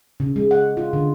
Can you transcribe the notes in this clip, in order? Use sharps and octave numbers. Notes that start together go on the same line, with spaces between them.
C#3
G#3
F#5
F4
D3